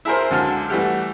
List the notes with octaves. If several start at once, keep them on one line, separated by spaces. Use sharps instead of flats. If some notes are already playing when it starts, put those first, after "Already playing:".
E4 G#4 A#4 C5
C#2 D3 F#3 A5 F6
E3 G3 A3 F#4 G4